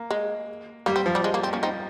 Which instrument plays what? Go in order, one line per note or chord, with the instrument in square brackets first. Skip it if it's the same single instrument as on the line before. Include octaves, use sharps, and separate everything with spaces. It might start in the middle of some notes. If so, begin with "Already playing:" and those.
Already playing: [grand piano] A#3
[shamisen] G#3
[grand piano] G3 [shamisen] A#3
[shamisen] C4
[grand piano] F3
[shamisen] G3
G#3
A#3
C4
A#3 C#4
C4 D#4